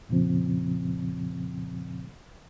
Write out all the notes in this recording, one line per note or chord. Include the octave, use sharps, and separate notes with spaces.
F2 A#2 C#3 F3 C4